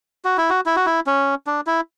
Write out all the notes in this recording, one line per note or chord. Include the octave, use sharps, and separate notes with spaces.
F#4
E4
F#4
E4
F#4
E4
C#4
D4
E4